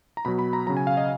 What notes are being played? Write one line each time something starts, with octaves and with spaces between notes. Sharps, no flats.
A#5
B2 F#3 B5
B5
A#5
C#3 F#3 A#5
G#5
F5
D#5